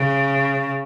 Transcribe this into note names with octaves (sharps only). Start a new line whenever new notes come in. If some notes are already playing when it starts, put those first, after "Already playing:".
Already playing: C#3